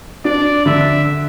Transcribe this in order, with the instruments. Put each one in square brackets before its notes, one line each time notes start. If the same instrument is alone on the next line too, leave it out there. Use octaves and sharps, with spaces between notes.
[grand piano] D4 [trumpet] D5
[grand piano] D3 [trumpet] E5